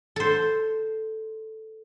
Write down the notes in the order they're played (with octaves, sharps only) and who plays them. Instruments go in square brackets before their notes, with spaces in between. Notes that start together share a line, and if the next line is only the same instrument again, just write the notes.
[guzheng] A4 C5